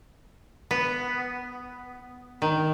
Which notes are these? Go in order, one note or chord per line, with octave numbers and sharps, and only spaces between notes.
B3
D#3